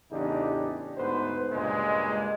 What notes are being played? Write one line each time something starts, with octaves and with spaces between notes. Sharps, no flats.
A1 E2 C#3 D4 D#4 G4
D2 G#2 B3 B4 C5
C#2 G2 A#2 G#3